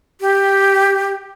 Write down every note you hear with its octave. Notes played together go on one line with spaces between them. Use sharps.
G4